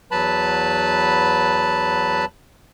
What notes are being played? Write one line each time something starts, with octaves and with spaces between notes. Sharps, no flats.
E2 F#3 B4 A5 B5